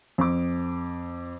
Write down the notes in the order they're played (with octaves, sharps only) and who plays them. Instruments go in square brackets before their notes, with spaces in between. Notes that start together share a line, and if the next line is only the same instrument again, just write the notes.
[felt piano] F2 D6